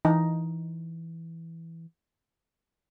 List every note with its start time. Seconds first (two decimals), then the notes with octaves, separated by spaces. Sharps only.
0.05 E3 D#4